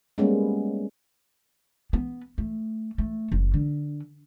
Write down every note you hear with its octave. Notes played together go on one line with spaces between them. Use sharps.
G3 G#3 A#3 B3 C#4
B3
A3
A3
F#1
D3